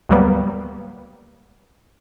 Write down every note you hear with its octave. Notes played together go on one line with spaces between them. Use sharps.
D2 G#2 F#3 G3 A#3 B3